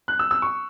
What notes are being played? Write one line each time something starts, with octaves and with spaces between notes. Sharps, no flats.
F#6
E6
E6
C#6